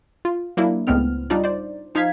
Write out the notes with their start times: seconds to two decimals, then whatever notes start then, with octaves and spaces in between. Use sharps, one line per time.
0.25 F4
0.57 F#3 A#3 D4 E4
0.87 C#2 A2 B3 C4 F6
1.30 G3 D4 D#4 F4 D5
1.44 C5 D5
1.95 F3 D#4 F5 G#6 B6